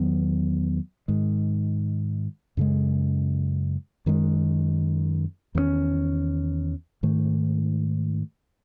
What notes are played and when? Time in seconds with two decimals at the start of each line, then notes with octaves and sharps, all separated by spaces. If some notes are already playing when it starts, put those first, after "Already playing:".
Already playing: E2 D#3 F#3 B3
1.08 G#2 D#3 G#3
2.57 F#2 C#3 G#3
4.06 F#2 D#3 G#3
5.55 E2 D#3 A3 C#4
7.03 G#2 D#3 A3